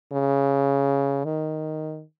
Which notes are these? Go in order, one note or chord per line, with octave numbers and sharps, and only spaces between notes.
C#3
D#3